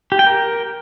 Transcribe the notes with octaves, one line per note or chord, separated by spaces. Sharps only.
G4
G5
A#4